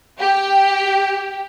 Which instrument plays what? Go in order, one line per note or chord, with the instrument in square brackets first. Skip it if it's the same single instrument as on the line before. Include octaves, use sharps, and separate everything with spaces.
[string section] G4